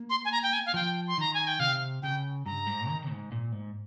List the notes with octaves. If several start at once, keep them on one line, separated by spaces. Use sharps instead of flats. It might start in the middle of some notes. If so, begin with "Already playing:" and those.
Already playing: A#3
C6
G#5
A#5
G5
G#5
F5
F3 G5
C6
D#3 A#5
G#5
G5
C3 F5
C#3 G5
G2 A#5
G#2
D#3
G#2
A#2
G#2